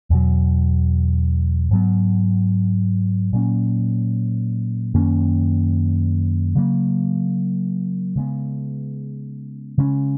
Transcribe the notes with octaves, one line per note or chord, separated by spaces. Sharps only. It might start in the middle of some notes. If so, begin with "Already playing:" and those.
E2 B2 F#3
G#2 F#3 B3
A#2 F#3 A#3 C#4
F#2 D#3 A#3 C#4
C#3 F#3 A#3
C#3 G#3 B3
C#3 G#3 C#4